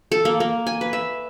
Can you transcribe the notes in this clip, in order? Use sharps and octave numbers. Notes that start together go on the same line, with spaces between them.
A4
A#3
A#3
G#5
B4
E5